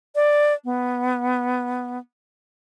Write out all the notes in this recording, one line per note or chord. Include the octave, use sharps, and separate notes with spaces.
D5
B3